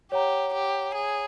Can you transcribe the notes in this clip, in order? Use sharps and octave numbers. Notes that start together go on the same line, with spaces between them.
G4 C#5 F#5 A#5
G4
G#4